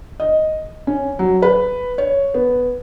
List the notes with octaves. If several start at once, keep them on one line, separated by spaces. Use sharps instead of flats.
D#5
C#4
F#3
B4
C#5
B3